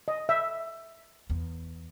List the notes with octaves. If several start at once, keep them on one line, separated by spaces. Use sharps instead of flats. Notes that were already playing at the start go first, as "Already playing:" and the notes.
D#5
E5
E2